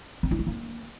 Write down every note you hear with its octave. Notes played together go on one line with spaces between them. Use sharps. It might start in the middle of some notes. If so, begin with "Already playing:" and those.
C4
E4
G#3
A#3